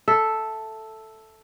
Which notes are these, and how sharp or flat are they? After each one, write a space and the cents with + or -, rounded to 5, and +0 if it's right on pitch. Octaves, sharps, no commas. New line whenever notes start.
A4 +0 E5 +0